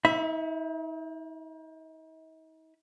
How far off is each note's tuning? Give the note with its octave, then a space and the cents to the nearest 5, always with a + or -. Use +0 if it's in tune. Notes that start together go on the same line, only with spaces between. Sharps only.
D#4 +45 E5 +0 B5 +0